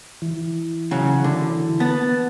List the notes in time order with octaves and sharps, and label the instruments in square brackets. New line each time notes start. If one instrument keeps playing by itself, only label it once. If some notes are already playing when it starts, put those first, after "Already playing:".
[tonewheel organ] E3
[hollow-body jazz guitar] C#3 F#3
D3
[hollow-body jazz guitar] B3 [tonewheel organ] A5